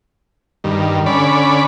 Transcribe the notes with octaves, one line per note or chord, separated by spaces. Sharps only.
G2 D#3
D3 C#4 D5 B5